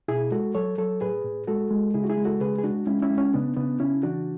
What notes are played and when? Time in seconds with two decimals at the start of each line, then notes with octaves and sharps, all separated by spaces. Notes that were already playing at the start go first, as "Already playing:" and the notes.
0.08 B2 E4 G#4
0.31 G#3 F#4 A4
0.55 F#3 A4 C#5
0.78 F#3 A4 C#5
1.01 A2 G#4 B4
1.24 A2
1.48 G#3 F#4 A4
1.71 G#3
1.94 C#3 E4 G#4
2.04 F#4
2.10 E4 G#4
2.17 G#3
2.25 F#4 A4
2.41 C#3 G#4 B4
2.58 G#4
2.63 G#3 D4 F#4
2.87 G#3 C#4 E4
3.02 C#4 E4
3.10 G#3
3.18 C#4
3.34 C#3 B3 D4
3.57 C#3 B3 D4
3.80 C#3 C#4 E4
4.03 E3 D4 F#4